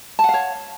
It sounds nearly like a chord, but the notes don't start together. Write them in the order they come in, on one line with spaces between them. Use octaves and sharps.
A5 F#5 F5 C#5